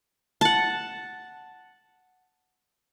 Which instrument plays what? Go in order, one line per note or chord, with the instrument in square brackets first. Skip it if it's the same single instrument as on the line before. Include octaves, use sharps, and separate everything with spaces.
[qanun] F#5 A5